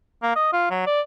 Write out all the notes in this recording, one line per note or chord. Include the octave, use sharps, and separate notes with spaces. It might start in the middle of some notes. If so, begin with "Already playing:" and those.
A#3
D#5
F4
F#3
D5